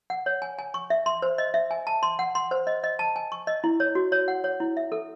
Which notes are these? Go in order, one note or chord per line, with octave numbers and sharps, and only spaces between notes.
F#5
C#5
G#5
G#5
C#6
E5
C6
C5
D#5
E5
G#5
A5
C6
F#5
C6
C5
D#5
D#5
A5
G#5
C#6
D#5
E4
C#5
F#4
C#5
F#5
C#5
E4
E5
A4